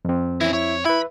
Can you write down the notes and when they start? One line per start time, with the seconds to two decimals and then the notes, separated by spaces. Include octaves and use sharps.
0.05 F2 C4
0.41 E3 C#4 E4
0.53 E4 C#5
0.85 E4 B4 E5 B5